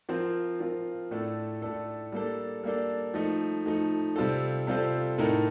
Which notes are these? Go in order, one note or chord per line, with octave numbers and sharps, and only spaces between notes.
F3 C4 F4 A#4
F3 C4 F4 A#4
A2 A3 D4 A4
A2 A3 D4 A4
G3 A#3 D4 A4
G3 A#3 D4 A4
F3 A3 D#4
F3 A3 D#4
C3 G3 C4 F4 A4
C3 G3 C4 F4 A4
A2 A3 D#4 A#4